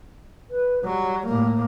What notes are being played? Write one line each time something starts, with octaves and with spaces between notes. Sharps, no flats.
B4
F#3 G3
A2 A#3